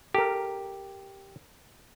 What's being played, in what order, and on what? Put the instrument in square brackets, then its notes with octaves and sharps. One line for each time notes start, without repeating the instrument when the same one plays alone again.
[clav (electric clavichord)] G4 [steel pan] A4 A#4